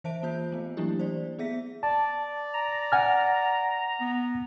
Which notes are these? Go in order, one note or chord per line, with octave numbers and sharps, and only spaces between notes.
E3 C5 E5 A5 D7
A#3 F4 C5 G6
A3 B3
E3 F#3 A#3 D4 E4 G4
C5 D5
B3 G#4 E5 B6
D5 A5
A#5
F#5 G#5 F6
B3